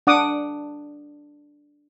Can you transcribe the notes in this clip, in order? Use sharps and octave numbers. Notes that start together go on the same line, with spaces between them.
D4 F#5 D6 D#6